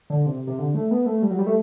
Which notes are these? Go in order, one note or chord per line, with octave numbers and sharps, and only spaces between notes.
D3
C3
C3
D3
A3
B3
A3
G3
F#3
G3
A3